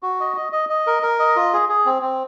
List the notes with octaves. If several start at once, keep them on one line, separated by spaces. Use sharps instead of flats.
F#4
D#5
D#5
D#5
D#5
A#4
A#4
D#5
F4
G#4
G#4
C4
C4